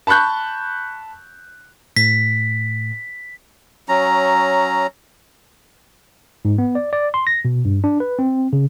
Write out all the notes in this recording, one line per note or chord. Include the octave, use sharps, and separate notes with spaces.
A5 B5 C#6 F#6 G6
A2 B6
F#3 C#4 A#5
G#2
B3
D5
D5
C6
A#6
B2
G2
D4
B4
C4
C#3